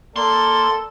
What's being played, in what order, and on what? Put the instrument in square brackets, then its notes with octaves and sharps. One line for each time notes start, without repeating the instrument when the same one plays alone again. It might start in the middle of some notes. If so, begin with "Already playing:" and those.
[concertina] A#3 [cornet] A4 [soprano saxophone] D5 [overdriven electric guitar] C6